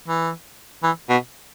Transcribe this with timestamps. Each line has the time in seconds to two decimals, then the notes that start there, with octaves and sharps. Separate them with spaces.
0.08 E3
0.83 E3
1.09 B2